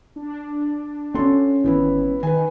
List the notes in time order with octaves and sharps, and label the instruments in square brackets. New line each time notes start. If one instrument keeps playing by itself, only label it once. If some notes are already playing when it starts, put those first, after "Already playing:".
[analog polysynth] D4
[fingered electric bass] C4 C#4 [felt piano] F#4 A4 C6
[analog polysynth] G#1 [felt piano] E3 B3 E4
[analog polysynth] D#3 [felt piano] B4 G#5